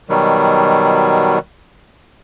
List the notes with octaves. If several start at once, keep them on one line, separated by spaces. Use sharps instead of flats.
B2 D#3 F#3 G3